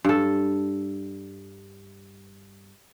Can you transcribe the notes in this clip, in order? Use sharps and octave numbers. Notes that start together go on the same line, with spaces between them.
G2 A4